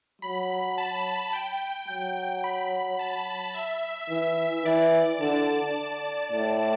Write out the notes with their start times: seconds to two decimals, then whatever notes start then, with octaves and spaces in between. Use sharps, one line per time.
0.22 F#3 B5
0.78 A5
1.33 G5
1.88 F#3 G5
2.44 B5
2.99 A5
3.54 E5
4.10 E3 E5
4.65 E3 D5
5.21 D3 A5
6.32 A2